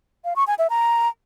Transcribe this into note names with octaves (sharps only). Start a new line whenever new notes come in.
F5
C#6
G#5
E5
A#5